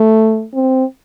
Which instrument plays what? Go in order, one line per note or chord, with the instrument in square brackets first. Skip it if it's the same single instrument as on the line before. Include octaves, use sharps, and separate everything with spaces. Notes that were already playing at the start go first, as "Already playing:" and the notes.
Already playing: [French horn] A3
C4